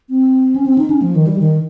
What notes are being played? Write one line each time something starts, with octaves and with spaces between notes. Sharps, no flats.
C4
C#4
C4
D#4
C#4
F3
D#3
G3
D#3